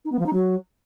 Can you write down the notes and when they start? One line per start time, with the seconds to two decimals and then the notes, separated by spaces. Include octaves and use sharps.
0.05 D#4
0.12 B3
0.19 F3
0.26 D#4
0.33 F#3